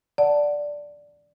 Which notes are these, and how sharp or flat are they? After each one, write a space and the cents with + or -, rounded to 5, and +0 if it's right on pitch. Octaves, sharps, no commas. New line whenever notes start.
D5 +0 F#5 +0 A5 +0